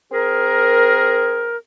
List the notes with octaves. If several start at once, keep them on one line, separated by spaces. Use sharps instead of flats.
C4 G#4 A#4